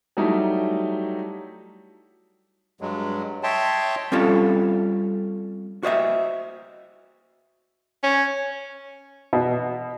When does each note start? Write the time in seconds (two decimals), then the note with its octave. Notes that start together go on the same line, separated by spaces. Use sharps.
0.17 F#3 G3 A3 D#4 E4
2.81 G2 F#3 G#3
3.43 C#5 D#5 E5 G5 A5 C6
4.12 G3 C4 C#4 F4 A4
5.83 F#4 C5 D#5 E5
8.03 C#4
9.33 B2